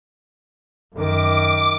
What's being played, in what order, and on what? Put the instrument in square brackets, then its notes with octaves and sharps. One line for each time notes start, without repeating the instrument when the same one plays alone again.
[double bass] F#2 D#3 [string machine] D6